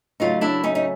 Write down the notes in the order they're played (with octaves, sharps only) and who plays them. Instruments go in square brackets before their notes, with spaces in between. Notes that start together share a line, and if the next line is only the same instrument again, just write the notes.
[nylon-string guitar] C#3 F#3 A3 D#4 F4
D4 E4
C#4 D#4
D#4